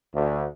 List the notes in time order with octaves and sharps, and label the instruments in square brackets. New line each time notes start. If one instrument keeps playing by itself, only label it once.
[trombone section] D2